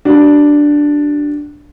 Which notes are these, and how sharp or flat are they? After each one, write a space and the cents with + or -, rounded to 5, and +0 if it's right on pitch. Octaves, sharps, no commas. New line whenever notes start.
D4 +0 G4 -45